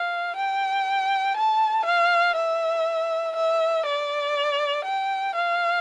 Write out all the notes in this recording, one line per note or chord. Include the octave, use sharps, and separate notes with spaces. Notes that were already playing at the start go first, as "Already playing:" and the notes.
Already playing: F5
G5
A5
F5
E5
E5
D5
G5
F5